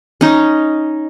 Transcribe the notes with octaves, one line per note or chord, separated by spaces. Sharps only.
C#4 D#4